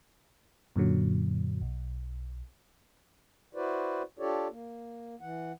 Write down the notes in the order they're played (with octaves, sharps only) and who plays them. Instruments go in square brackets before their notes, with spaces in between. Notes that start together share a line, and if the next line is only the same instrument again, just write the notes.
[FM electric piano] F#2 A#2 D3 F#3
B1
[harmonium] E4 F#4 B4 C5 D5
D4 F4 G4 A4 C#5 D5
A#3
E3 F#5